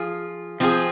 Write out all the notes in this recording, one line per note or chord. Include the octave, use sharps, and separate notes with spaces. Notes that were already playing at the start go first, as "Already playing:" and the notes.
Already playing: F3 F4 G#4
F3 C4 F4 G#4